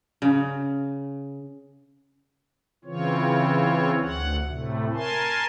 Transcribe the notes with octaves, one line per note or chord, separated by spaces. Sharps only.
C#3
C#3 E3 C4 F4 C#5
D2 F#5
A2 C3 A3
A#4 G#5 A5 C6